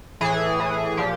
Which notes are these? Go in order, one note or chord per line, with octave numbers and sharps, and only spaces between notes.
A2 E3 G#4
A2 E3
A#2 F3 G4